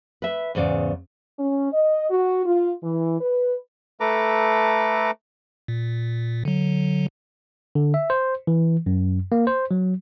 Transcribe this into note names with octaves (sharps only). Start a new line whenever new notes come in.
B4 E5
E2 G#2 C#3 D5
C#4
D#5
F#4
F4
E3
B4
A3 A4 B4 A#5 D6
A#2
D3 F#3
D3
E5
C5
E3
F#2
A#3
C5
F#3